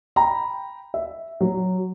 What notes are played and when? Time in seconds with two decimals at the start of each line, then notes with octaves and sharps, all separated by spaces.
0.16 G5 A#5 B5
0.94 E5
1.41 F#3